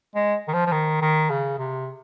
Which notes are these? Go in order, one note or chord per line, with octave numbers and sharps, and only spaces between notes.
G#3
D#3
F3
F3
D#3
D#3
C#3
C3